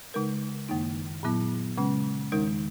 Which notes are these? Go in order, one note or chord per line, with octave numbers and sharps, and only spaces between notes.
C#3 G#3 D#4 A#4
F#2 D#3 A#3 D#4
A#2 F#3 B3 E4
C#3 G#3 C#4
E2 D#3 G#3 D#4 A#4